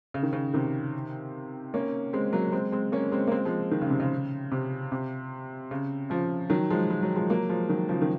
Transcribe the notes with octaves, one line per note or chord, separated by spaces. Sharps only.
C#3
D#3
C#3
C3 D#3
A#3 C#4
G#3 C4
F#3 A#3
G#3 C4
G#3 C4
A#3 C#4
G#3 C4
A#3
G#3 C4
F3 G#3
D#3
C#3
C3
C#3
C3
C3
C#3
C#3 F3
D#3 F#3
F3 G#3
G#3
F#3
F3 G#3
F#3 A#3
F3 G#3
D#3 F#3
C#3 F3
D#3